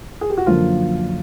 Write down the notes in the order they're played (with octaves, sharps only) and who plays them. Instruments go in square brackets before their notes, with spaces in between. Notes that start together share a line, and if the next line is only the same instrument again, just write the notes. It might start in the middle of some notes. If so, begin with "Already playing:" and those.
[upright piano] G#4
G4
F#4
[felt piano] F#2 D3 F3 A#3 [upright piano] F4